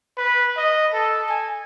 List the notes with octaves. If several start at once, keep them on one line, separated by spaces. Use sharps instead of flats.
B4
D#5
A4
G#5